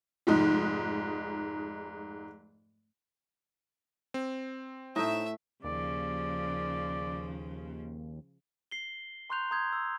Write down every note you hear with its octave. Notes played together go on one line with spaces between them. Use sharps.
F1 G#2 D#4
C4
A2 A3 D#4 E5 E6
D#2 C#3 F3 D5
C7 G7
A#5 C6 C#6 F#6 G6 F7
A#5 C6 D#6 G6 G#6
E6